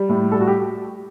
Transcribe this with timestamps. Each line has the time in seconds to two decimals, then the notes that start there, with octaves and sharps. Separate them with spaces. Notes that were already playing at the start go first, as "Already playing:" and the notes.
Already playing: G3
0.09 A2
0.32 G3 A4
0.40 F#4
0.47 G4